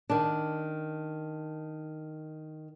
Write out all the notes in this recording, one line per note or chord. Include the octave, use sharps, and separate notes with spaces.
D#3 D4